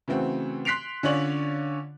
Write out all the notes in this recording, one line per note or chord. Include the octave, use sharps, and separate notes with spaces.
C#3 E3 A3 C4 F#4
C6 F#6 B6 C7 D7 F7
D3 C#4 F4 C#5 D5 F#7